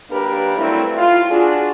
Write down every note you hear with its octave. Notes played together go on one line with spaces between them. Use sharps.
F#3 A#3 D4 G4 A#4 B4
F#3 G3 A3 C4 E4
F4
D4 F#4 G#4